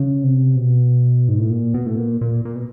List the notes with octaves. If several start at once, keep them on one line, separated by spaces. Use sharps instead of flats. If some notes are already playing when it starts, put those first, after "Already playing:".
Already playing: C#3
C3
B2
G#2
A2
A#2
B2
A2
A#2
A#2
A#2
B2